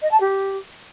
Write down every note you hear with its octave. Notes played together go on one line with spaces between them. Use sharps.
D#5
A5
G4